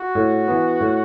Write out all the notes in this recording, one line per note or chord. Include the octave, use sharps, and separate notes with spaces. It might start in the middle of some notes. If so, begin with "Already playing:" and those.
Already playing: F#4
A2
E3 B3
A2